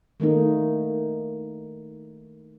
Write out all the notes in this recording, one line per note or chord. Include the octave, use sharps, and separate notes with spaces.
D#3 A3 A#3 D#4